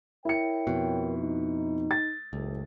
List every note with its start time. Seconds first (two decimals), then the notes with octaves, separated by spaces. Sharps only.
0.25 E4 A#4 C#5 G5 C#7
0.67 F2 B2
1.18 D#4
1.91 A6
2.33 F#1 C#2 A2